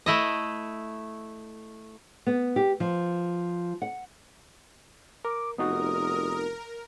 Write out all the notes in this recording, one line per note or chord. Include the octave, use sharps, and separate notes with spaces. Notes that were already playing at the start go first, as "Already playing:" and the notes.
A3 E4 D#5
B3
G4
F3
F#5
A#4 D6
F1 B3 D#4 F#4 A#4 D#6